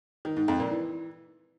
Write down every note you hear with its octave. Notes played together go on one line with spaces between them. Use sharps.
D#3
G#2
F2
A#2
E3